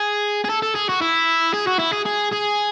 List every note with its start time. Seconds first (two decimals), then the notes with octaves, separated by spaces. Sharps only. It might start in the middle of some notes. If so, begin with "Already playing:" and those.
Already playing: G#4
0.44 G#4
0.49 A4
0.62 A4
0.75 G#4
0.89 F#4
1.01 E4
1.53 G#4
1.67 F#4
1.79 E4
1.93 G#4
2.05 G#4
2.32 G#4